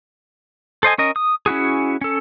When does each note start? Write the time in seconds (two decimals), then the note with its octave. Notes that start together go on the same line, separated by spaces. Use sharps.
0.83 A4 C5 D#5 G#5
0.98 C#4 A#4 D#5
1.16 D#6
1.46 C#4 E4 F#4 G#4
2.01 C#4 A4